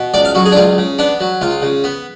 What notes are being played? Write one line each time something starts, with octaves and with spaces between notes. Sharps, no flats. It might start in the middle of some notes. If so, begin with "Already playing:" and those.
Already playing: B2
C#2 D5
F5
F#3 F#4
G#4
D4
C#2 F4
C#3
B3 D4
F#3
C#2 F4
C#3
B3